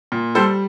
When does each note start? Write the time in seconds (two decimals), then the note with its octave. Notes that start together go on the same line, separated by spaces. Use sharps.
0.12 A#2
0.35 G3 A4 C5